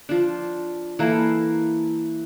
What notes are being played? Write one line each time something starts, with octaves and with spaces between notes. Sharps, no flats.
F3 D4
E3 A#3 E4 A4